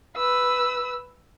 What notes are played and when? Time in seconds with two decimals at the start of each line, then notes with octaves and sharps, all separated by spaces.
0.16 B4 E6